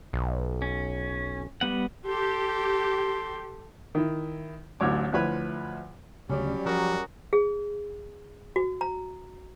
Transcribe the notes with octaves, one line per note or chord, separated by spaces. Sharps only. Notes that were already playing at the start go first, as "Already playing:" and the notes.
B1
C#4
G3 B3 F#5
G4 A4 C6
D#3 E4
A1 D2 F#3 C#5 D6
D2 F3 E4 B4 C#5 B5
D2 C#3 F#3 G3 C#4 D5
F3 F#4 G#4 A#4 D5
G#4
F#4
A#5